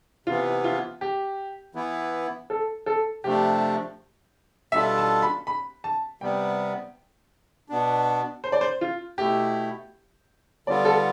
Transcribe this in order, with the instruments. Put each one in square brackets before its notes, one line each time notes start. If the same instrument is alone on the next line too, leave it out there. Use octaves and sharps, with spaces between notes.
[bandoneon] C3 E3 B3 [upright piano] F4
[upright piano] F4
G4
[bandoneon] E3 B3 E4
[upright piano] A4
A4
[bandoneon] C3 F3 A3 D4 [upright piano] G4
[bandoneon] B2 G3 D4 F4 A4 [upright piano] E5
[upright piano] A5
B5
B5
A5
[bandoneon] C3 G3 B3 [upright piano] G5
[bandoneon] B2 B3 D4
[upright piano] C5
D5
C5
F4
[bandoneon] B2 A3 E4 [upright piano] G4
[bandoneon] D3 G3 B3 F4 [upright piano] D5
[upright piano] A4